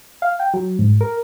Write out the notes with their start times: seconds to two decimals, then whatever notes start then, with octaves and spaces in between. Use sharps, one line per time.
0.22 F5
0.40 G5
0.54 F#3
0.79 G#2
1.01 A#4